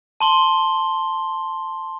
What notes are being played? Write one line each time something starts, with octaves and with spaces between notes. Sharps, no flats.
A5 C6 G7